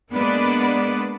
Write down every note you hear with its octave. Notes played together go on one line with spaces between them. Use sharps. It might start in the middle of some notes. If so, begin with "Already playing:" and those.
G#3 A#3 B3 D4 B4 D5